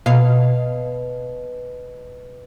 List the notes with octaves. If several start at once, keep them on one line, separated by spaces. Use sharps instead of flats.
B2 F5